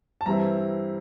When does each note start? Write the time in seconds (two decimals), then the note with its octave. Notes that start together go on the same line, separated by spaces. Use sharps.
0.21 A5
0.26 G2 E3 G3 C4 E4 A#5